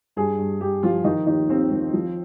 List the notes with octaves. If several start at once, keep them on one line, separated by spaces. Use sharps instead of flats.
G2 G#4
G2
G2 G4
F3 F4
D#3 D#4
D#2 D#4
D#2 C4
D#3
F3